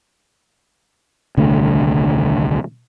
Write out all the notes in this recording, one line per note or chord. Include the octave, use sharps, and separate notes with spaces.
D#1 C2 D3 A3